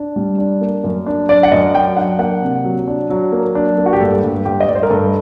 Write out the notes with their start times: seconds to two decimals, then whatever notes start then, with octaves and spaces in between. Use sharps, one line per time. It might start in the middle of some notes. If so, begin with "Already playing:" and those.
Already playing: D4
0.16 G3
0.38 D4
0.61 A#3
0.84 F#2
1.06 D4
1.29 D4 D5
1.43 F#5
1.52 F#2 D#5
1.74 F#3 G5
1.97 D4 F#5
2.19 A#3 F#5
2.42 C3
2.64 F#3
2.88 D4
3.10 F#3
3.32 A#3
3.55 D4
3.78 A#3
3.86 F#4
3.93 G4
4.00 G2 A4
4.23 G2
4.45 G2 G4
4.60 D#5
4.68 G2 D5
4.75 C5
4.83 A#4
4.90 G2 A4